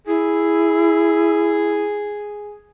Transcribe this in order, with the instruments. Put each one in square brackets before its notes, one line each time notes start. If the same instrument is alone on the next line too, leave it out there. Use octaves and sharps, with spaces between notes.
[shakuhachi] E4 [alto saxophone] G#4